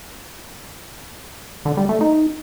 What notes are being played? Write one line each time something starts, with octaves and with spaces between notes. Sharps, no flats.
D3
G3
A3
D#4